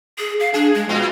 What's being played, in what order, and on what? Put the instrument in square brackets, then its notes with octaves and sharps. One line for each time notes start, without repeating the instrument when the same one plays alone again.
[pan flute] G#4
F5
[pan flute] D4 [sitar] G#4
[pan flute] G#3
[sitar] A#2 B3 F4 [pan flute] D#5